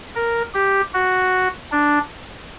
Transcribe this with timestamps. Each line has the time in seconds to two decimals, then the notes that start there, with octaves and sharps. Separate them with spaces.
0.15 A#4
0.54 G4
0.94 F#4
1.72 D4